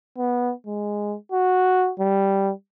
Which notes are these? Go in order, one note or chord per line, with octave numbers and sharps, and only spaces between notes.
B3
G#3
F#4
G3